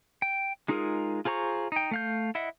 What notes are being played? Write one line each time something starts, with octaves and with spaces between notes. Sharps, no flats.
G5
G#3 D#4 F4 G#4 A#4
F4 G#4 C5 A#5 C#6
D#4 G5
A3 F5 G6
E4 D#5 E5 F#5